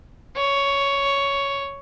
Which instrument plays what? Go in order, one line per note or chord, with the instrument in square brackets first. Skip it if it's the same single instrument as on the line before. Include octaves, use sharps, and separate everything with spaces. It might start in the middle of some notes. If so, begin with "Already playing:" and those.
[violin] C#5